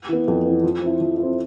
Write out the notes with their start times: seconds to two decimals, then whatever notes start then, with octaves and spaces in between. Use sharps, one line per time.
0.09 E3 B3
0.28 F2
0.45 E3 B3
0.64 F3
0.82 C4 E4
1.00 F3
1.18 C4 E4